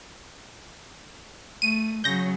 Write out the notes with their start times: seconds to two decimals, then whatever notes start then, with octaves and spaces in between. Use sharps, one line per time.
1.62 A3 D#7
2.04 C#3 F#3 G6 A#6